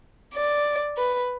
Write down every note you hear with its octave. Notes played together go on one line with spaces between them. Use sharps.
D5
B4